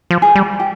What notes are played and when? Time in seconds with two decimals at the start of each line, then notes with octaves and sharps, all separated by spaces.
0.11 F3
0.22 G#4
0.35 G3
0.60 G4